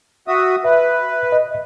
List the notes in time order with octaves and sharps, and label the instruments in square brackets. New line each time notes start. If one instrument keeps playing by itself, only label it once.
[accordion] F#4 E5 D#6
[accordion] B4 [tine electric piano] E5
[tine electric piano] D#5